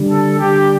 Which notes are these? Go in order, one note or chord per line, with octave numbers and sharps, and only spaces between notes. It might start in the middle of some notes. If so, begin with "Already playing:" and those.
Already playing: D3 G3
A4
D3 G3 G4